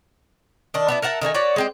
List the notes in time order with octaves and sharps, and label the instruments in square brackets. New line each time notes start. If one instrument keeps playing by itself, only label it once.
[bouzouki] D#3 D4
B3 D4 E4
A#4 E5 F#5 A5
D#3 A3 D#4 G#5
F#4 B4 C#5 D5
G#3 C4 G4